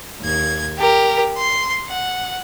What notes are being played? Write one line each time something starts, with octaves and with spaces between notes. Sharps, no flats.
D#2 G#6
G4 A#4
C6
F#5